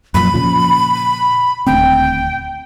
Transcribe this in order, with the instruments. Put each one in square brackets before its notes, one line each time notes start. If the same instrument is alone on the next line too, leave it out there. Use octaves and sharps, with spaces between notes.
[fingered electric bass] F#2 A#2 F3 [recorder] B5
[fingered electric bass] A#2 C#3 F3
[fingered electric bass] D#1 D2 C4 [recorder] G5